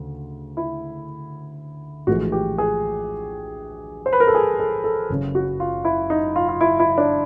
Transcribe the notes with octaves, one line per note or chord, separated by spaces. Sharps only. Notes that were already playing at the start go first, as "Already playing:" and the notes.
Already playing: D2 C#3
E4
A#1 A2 E3 G#3 F#4
G4
G#4
C5
B4
A#4
A4
G#4
A4
A4
F#1 F#2 C#3
F#4
F4
E4
D#4
F4
F4
E4
E4
D4